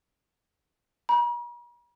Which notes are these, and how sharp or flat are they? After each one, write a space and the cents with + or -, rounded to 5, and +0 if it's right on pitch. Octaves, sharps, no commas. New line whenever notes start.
A#5 +45